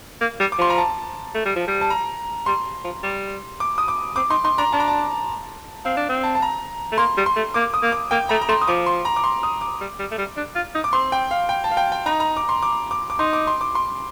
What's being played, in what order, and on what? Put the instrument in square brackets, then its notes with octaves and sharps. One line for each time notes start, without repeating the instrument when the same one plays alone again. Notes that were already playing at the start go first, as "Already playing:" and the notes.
[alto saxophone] A#3
G3
[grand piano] D6
[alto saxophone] F3 [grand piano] C6
[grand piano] A#5
A5
[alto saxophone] A3
G3
F3
G3
[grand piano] A5
A#5
[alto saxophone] G3 [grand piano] C6
[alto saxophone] F3
G3
[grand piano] D6
D#6
D6
[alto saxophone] C4 [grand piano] D6
[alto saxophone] D#4 [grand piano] C6
[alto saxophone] D#4 [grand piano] C6
[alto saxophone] D4 [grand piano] A#5
[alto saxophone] D4 [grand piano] A5
[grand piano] A#5
A5
[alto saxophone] C4 [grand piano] F5
[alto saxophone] D4
C4
[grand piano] A5
A5
A#5
[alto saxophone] A3
[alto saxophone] A#3 [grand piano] C6
[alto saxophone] G3
[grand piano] C6
[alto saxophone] A3
[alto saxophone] A#3 [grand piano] D6
[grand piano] D#6
[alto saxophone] A#3
[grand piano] D6
[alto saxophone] A#3 [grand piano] G5
[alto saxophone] A3 [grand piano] A#5
[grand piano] A#5
[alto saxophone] A3 [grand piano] C6
[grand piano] D#6
[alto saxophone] F3 [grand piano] D6
[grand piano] C6
A#5
D6
C6
D#6
D6
[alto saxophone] G3
G3
A3
G3
D4
F4
D#4
[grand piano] D6
[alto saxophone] C4 [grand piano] C6
[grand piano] G5
F5
G5
A5
F5
G5
G5
[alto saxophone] D#4 [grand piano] A#5
[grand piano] A#5
D6
C6
D6
D6
D6
[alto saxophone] D#4 [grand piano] C6
[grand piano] D6
C6
D6
C6